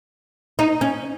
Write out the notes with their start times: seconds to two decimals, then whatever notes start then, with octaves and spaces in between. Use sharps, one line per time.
0.59 D#4
0.81 C#4